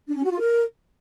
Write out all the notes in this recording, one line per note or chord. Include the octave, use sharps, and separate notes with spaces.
D4
C#4
F#4
F4
A#4